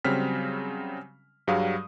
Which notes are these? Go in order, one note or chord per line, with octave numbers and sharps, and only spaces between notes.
C#3 F#3 G3 C4 F6 B6
G2 F#3 G3 G#4 F5 D#6